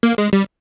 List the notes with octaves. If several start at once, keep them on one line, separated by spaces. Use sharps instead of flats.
A#3
G#3
G3